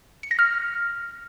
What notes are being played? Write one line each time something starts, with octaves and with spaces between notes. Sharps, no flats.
C#7
A#6
F6